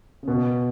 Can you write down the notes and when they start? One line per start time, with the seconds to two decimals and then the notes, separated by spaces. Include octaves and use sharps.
0.23 C#3
0.28 B2